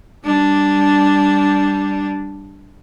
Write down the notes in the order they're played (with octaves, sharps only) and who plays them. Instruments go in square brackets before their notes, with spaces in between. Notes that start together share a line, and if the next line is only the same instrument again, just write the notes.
[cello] G3 D4